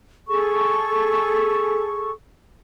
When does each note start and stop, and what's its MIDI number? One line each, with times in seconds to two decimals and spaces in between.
0.28 2.11 68
0.28 2.11 69
0.28 2.11 85